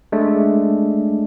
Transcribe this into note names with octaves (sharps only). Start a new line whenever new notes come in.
G#3 A3 D4